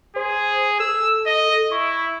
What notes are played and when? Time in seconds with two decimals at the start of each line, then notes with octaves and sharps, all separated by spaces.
0.16 G#4 C5
0.80 A4 E6
1.26 D#5
1.71 E4 C#6